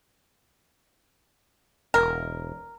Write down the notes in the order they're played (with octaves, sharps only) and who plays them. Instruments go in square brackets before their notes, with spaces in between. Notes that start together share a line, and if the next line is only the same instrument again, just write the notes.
[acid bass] E1 [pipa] A#4